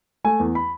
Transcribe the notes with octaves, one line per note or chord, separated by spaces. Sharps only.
A3 G#5
E2
B5